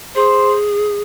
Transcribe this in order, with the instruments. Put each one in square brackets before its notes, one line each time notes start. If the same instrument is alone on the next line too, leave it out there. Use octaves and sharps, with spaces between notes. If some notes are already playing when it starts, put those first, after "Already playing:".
[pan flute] G#4 [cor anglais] C5